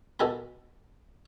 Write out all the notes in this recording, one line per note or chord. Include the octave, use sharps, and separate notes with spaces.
B2 A4 A#4 G#5 B5